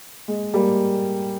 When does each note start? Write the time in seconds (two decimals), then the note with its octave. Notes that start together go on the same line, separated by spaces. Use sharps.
0.28 G#3
0.54 G3 A#3